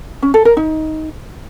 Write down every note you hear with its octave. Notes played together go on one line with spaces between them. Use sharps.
C#4
A4
A#4
D#4